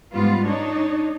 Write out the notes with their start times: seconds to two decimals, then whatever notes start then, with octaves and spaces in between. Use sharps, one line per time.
0.14 G#2 G3 B3 F4
0.47 D4 D#4 C#5